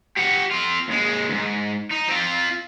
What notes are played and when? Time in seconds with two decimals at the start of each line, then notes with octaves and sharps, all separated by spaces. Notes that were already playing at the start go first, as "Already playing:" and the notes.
0.17 G4 F#5
0.51 C4 F4
0.88 D#2 G#3
1.30 D2 G#2
1.91 D#4
2.08 C4 F4